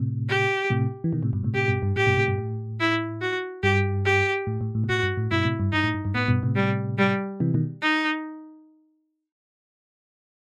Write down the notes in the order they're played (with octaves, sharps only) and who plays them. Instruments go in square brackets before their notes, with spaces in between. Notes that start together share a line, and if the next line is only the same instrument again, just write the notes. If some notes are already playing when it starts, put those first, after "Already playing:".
Already playing: [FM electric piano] A2 C3
[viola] G4
[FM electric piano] A2 C3
E3
B2 D#3
A2 C3
G2 B2
A2 C3
[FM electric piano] A2 C3 [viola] G4
[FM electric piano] G2 B2
G2
[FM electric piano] A2 [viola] G4
[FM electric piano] G2 B2
A2 C3
G2 B2
A2
[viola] E4
F#4
[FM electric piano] G2 [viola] G4
[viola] G4
[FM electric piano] A2
A2
A2
B2
[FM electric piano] A2 [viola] F#4
[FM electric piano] G2
A2
[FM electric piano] G2 B2 [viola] E4
[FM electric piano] A2 C3
G2
[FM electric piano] G2 [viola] D#4
[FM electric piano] A2
G2
G2
[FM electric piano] A2 [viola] B3
[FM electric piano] G2 B2
A2 C3
[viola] G3
G3
[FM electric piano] C3 E3
B2 D#3
[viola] D#4